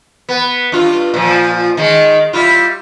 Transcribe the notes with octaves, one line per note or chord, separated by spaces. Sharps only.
B3
G2 F4
A#2 F3
D#3 G#3
G3 E4 F4